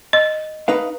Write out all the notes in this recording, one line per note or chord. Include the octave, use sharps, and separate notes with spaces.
D#5
D#4 B4 F5